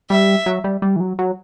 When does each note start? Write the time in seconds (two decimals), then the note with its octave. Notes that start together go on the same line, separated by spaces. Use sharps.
0.10 G3 E5
0.46 F#3
0.64 G3
0.82 G3
0.96 E3
1.00 F#3
1.19 F#3